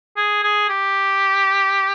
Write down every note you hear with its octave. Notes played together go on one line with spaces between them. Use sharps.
G#4
G#4
G4